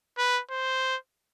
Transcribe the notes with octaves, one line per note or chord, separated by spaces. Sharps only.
B4
C5